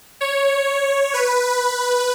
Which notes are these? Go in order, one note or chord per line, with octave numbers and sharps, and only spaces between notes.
C#5
B4